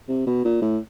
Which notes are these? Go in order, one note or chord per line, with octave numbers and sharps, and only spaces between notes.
C3
B2
A#2
A2